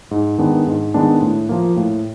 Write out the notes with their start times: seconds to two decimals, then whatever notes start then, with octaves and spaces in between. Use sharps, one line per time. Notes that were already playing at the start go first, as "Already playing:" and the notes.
0.11 G#2
0.38 D#3 G#3 B3 D4
0.67 G#2
0.94 D#3 G#3 B3 D4
1.22 A2
1.49 F3 A#3
1.77 A2